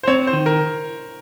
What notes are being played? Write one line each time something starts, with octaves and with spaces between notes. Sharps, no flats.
C5
C4 C#5
C5
D#3
A#4